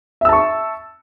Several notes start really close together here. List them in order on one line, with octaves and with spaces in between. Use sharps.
E5 E6 A5 C#6